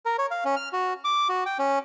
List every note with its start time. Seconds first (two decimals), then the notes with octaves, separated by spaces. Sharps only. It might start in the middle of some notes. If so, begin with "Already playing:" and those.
0.05 A#4
0.18 C#5
0.31 F5
0.45 C#4
0.56 F6
0.73 F#4
1.04 D6
1.29 F#4
1.46 G5
1.59 C#4